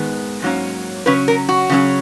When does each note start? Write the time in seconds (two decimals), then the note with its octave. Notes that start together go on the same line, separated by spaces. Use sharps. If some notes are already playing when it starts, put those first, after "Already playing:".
Already playing: G#2 D#3 G#3 B3
0.42 G#2 F#3 A#3 C#4
1.06 C#3 F#3 C#4 B4
1.28 A#4
1.49 F#4
1.70 C#3 F#3 C#4